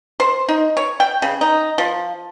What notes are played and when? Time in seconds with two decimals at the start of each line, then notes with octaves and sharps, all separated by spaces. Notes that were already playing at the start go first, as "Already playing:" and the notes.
0.20 C5
0.49 D#4
0.77 C#5
1.00 G5
1.22 C#3
1.41 D#4
1.78 F3